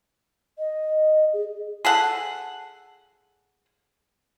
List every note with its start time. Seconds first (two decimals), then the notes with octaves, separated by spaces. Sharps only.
0.59 D#5
1.33 G#4
1.85 G#4 A4 F#5